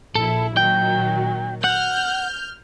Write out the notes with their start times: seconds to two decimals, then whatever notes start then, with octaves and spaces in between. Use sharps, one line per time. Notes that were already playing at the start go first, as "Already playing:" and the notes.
0.15 A#1 E4 A4
0.57 A#2 D#3 F#3 G5
1.64 F#5 F6 G6